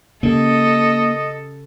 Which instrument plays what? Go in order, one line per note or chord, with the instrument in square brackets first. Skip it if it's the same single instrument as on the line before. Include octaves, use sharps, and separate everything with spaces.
[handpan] C#3 G4 [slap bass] A#3 [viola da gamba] A4 [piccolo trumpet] D#5